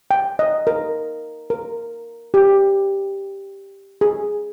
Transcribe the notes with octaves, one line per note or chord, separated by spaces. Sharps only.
G5
D#5
A#4
A#4
G4
G#4